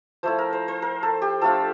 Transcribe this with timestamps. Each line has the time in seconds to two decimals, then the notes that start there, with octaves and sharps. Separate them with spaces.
0.23 F3 A3 E4 C5
0.39 A#4
0.53 C5
0.68 C5
0.82 A#4
1.03 A4
1.22 G4
1.41 F3 A3 D4 F4 A4